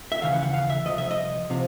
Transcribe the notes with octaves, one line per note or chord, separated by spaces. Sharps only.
E5
D#2 C#3 E3 F5
F#5
F#5
F5
E5
C2 C3 F3 D#5
E5
D#5
C3 F3